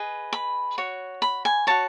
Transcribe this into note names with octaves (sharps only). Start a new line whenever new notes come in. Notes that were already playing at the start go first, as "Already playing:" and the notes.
Already playing: G#4 B4 D#5
B5
F#4 C#5
B5
G#5
F#4 C#5 A5